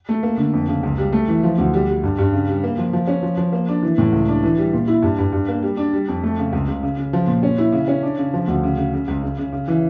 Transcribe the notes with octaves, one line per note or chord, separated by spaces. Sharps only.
A3
A#3
D3
F2
C#3
C#2
G3
A3
E3
F3
D2
G3
G3
G2
G2
C#3
G3
A#3
F3
F3
C#4
F3
F3
A#3
D4
E3
A2
C#2
D4
E3
G3
A#2
E4
G2
G2
G2
A#3
G3
D4
G3
F2
A3
C#3
C#2
C#2
C#3
C#3
F3
A#2
C#4
E4
C#3
C#4
D4
C#3
F3
D2
C#3
C#3
C#3
C#2
C#3
C#3
C#3
E3